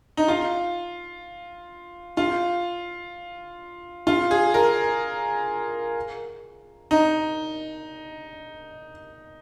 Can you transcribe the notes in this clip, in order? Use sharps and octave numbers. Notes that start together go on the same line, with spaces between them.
D#4
F4
F4
F4
G#4
A#4
D#4